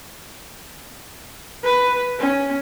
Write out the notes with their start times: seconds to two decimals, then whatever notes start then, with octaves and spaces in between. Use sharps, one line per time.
1.63 B4
2.19 C#4